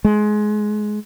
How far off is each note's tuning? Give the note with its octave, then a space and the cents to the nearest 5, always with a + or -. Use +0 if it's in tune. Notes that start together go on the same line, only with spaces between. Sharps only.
G#3 +20